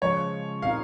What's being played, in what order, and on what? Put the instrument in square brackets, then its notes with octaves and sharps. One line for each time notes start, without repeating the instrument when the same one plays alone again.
[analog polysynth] C#3 F3 G#3 [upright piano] C#5
[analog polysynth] A#2 G3 C4 D#4 [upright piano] F5